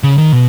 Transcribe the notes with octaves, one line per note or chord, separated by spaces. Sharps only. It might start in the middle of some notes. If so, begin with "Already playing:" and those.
C#3
D#3
B2